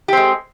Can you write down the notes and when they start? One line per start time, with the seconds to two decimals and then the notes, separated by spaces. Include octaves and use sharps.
0.08 G4
0.13 C4
0.17 G#3